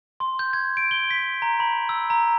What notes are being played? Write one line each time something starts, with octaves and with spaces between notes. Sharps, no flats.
C6
G6
G#6
D7
G7
B6
A#5
B5
E6
A#5